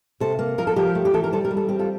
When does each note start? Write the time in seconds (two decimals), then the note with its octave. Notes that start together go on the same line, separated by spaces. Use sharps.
0.20 C3 A4 C5
0.39 A#3
0.58 F3 A#4
0.67 A4
0.76 F3 G4 A#4
0.95 A3
1.05 G4
1.14 E3 A4
1.24 A#4
1.33 G3 A4 C5
1.45 G4 A#4
1.51 G3
1.57 A4
1.69 C4 G4
1.79 F4 A4